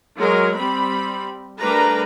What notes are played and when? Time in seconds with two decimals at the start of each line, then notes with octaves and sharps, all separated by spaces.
0.17 F#3 G#3 A#4
0.56 G3 C4 B5
1.59 G3 A3 D4 A#4 B4 A#5